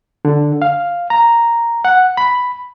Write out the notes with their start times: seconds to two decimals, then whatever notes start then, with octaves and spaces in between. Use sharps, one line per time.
0.25 D3
0.62 F5
1.10 A#5
1.85 F#5
2.17 B5